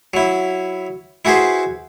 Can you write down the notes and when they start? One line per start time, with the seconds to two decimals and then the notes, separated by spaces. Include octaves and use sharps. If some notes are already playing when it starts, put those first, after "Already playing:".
0.14 F#3 E4
1.25 E4 F#4 G#4 B4 C5